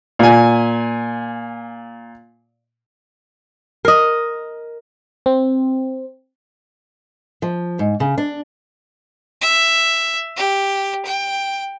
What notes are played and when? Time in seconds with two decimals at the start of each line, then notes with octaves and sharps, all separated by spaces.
0.19 A#2 G#5
3.85 A#4 D#5
5.26 C4
7.42 F3
7.79 G#2
8.00 C#3
8.18 D4
9.41 E5
10.36 G4
11.05 G5